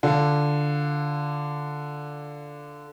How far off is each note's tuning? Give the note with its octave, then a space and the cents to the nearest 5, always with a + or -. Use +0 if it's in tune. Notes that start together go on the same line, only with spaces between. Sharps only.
D3 +0 D4 +0 F4 +0